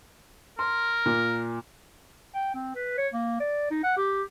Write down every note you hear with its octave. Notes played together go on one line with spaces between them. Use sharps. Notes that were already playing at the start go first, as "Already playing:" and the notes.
A#4 C6
A#2
G5
C4
B4
C#5
A#3
D5
D#4
F#5
G4